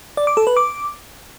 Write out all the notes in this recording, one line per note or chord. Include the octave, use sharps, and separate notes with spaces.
D5
D6
A4
B4
D6